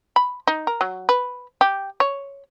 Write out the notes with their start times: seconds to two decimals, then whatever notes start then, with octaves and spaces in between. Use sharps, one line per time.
0.16 B5
0.47 D#4
0.67 A#4
0.81 F#3
1.09 B4
1.61 G4
2.00 C#5